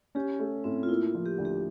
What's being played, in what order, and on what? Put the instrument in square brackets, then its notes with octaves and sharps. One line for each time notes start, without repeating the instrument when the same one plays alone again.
[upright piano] C#4 [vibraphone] G4
[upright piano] A3
[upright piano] A2 [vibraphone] C4
[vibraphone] F4
[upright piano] A#3 [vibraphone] E4
[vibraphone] F4
[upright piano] F3
[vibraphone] G4
[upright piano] D2
[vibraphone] G4